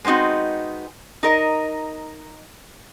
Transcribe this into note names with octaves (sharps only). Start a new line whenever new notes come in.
G#3 B3 C4 D#4 F#4
D#4 A#4 D#5